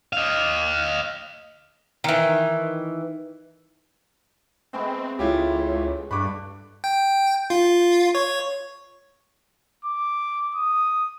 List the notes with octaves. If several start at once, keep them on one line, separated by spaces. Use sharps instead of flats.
D#5 F5
D#3 E3
G#3 A3 B3 C4
C#2 E4 F4 G4 C#5
G2 D3 D4 B5 C#6 D6
G5
F4
C#5
D6
D#6